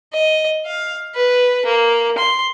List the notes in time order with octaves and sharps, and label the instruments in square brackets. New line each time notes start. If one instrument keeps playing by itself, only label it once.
[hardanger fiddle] D#5
F5
B4
A#3
C6